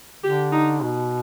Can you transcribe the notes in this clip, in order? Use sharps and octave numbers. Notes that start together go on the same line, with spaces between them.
D3 G4
D#4
B2